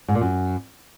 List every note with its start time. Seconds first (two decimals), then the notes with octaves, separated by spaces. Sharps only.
0.08 G#2
0.15 A#2
0.21 F#2